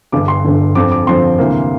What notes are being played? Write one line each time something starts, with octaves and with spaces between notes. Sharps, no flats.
G1 G2 D3 D6
C6
G1 G2 D3
F2 D3 F3 C4 D6
D6
F2 D3 F3 C4 C6
D2 C3 E3 A#3